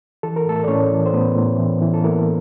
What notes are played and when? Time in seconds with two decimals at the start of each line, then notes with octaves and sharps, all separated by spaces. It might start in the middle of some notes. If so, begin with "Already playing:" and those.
0.23 E3 A4
0.36 A#4
0.45 A2 A3 A4
0.64 D5
0.68 A2 C#4 C#5
0.91 E3
1.06 C5
1.13 A2 B3 B4
1.36 A2
1.59 E3
1.82 E3
1.94 A4
2.04 E3 A#3 A#4